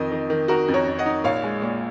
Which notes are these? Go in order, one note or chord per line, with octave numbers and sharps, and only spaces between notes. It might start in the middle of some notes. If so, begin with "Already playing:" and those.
Already playing: F2 D#3 D#5
D#3
D#3
D#4 F#4 A#4
F2
A#4 C#5
F2
D#5 F#5
D#4
A#1 C#5 F5
G#3
A#2